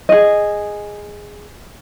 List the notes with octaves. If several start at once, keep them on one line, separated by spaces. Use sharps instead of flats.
G#4 D#5